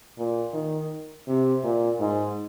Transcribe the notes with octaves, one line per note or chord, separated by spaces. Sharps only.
A#2
D#3
C3
A#2
G#2